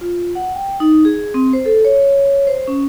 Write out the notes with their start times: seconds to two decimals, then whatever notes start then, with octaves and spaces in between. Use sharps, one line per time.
0.01 F4
0.35 F#5
0.55 G5
0.80 D#4
1.05 G#4
1.34 C4
1.53 C5
1.66 A4
1.85 C#5
2.47 C5
2.68 C#4